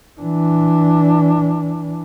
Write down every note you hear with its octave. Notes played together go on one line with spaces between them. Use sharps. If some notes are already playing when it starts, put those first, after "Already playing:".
E3 D4